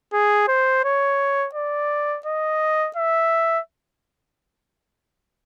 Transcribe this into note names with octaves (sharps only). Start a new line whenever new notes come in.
G#4
C5
C#5
D5
D#5
E5